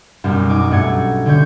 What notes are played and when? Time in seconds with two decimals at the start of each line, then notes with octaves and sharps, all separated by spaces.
0.24 B1 F#2 G3
0.49 D#4 G#5 D6
0.71 G2 A3 F#5 G#6 C#7
1.26 D3 C#4 C#5 G6